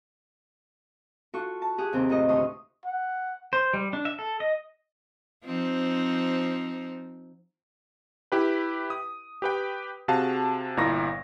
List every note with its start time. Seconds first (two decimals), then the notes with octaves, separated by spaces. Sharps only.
1.34 F4 F#4 A4 C#6
1.62 A5
1.78 G4 G#4 F#5
1.93 D#2 C3 C4
2.09 D#2 A2 F4 D#5
2.29 D2 A3 C6 C#6 D#6
2.86 F#5
3.53 C5
3.74 G3
3.93 D4
4.05 E5
4.19 A4
4.40 D#5
5.45 F3 C4 D#4
8.32 E4 G4 B4
8.90 D#6
9.42 G4 B4 G5
10.08 C3 F#4 G#4 F5 A5
10.77 G1 A#2 E4 A#5 C#6 A#6